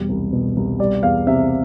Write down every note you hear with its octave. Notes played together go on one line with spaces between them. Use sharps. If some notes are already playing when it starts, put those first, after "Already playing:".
Already playing: E1 G3
C2
B2
C2
G3 D5
E2 F5
C3 E5